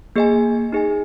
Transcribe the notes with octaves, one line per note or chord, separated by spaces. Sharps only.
A#3 G#4 D#5 G#5
D#4 G#4 D#5 G#5